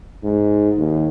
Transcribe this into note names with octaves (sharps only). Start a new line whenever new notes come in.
G#2
D#2